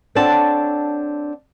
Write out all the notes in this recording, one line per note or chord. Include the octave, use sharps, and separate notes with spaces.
C4 D4 A4 C#5 F#5 A5